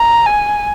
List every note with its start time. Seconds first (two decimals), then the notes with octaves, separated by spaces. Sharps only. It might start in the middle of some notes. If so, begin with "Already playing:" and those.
Already playing: A#5
0.26 G#5